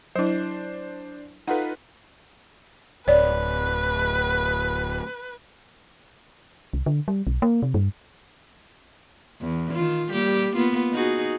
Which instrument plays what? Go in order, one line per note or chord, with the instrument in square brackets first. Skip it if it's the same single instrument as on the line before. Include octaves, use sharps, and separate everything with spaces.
[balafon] F#3 E4 [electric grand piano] D4 C5
[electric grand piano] D#4 F4 B4 [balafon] A4 F#5
[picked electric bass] D1 [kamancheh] B4 [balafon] C#5 D5
[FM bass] C2
D3
G3
B1
A#3
C3
G2
[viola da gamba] E2
D#3 F4
G3 A#3 G4
A#3 B3 F4
D#4 F#4 G#4